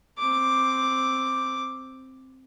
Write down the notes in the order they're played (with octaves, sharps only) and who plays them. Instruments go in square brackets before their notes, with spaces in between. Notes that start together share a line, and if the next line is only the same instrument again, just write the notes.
[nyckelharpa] C4 D6